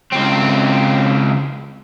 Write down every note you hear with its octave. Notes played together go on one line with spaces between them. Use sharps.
C#2 C4